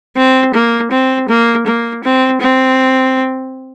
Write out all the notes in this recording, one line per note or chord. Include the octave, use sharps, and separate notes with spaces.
C4
A#3
C4
A#3
A#3
C4
C4